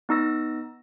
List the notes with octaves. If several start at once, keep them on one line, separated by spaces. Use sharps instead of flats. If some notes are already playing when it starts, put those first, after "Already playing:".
B3 D#4 E6 A#6